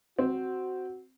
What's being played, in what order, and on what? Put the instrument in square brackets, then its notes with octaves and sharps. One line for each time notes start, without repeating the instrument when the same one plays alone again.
[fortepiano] C4 [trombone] F#4